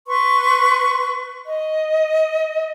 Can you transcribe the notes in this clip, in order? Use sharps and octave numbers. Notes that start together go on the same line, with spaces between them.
B4 C6 C#6
D#5